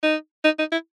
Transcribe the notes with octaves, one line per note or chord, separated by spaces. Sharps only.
D#4
D#4
D#4
E4